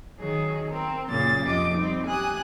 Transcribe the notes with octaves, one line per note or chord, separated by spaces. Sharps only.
D#3 F#3 G#4
C4 A#4
F#2 A#2 C#3 A#3 A6
F2 C3 F3 D#5 D6
G3 C4 D#4
G4 G#5 D#6 F#6